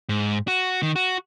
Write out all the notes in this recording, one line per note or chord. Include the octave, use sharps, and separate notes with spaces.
G#2
F#4
D#3
F#4